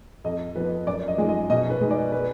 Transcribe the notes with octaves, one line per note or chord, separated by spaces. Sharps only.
F2 D#5
F3 B3 B4
F#2 D5
D#5
F3 G#3 D#4
D#5
B2 D#5
B4
G#3 D#4
D5
B4